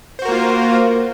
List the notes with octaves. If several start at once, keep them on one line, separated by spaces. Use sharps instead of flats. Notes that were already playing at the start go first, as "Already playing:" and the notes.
A#3 F4 F#4 A#4 C5